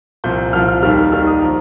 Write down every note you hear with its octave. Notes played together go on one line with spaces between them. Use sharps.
C2 A#2 F3 G6
C2 A#2 F3 F6
F6
D#2 D#3 G3 F6
F6
D#2 D#3 G3 F6
D#6
F3 A#5